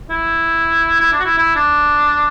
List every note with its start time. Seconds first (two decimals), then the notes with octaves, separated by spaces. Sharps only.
0.10 E4
1.00 E4
1.12 D4
1.20 F#4
1.25 E4
1.38 E4
1.56 D4